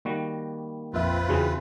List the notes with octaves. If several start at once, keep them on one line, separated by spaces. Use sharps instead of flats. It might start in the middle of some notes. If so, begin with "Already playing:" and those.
D#3 G3 A#3 F#4
A#1 F2 C4 F4 B4 E5
E2 C#3 E3 C#4 F#4 G#4